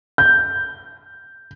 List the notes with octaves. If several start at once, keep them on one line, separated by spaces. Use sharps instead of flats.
G6